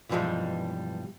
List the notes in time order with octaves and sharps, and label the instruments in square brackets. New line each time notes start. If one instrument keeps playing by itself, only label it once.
[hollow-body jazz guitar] B1 G2 E3 F3 G3 G#3